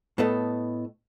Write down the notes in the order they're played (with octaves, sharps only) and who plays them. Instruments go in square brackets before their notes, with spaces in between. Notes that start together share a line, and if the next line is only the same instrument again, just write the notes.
[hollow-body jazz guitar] A2 B3 A4 D#5